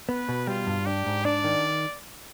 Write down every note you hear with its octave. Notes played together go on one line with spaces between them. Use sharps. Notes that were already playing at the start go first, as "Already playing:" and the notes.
B3 B4
B2
G3 F4
G2
D4 G4
G#2
D4 D5
D#3